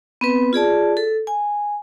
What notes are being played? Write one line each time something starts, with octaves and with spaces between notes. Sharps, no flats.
B3 C4 B4
F4 G#4 D5 A5
A4
G#5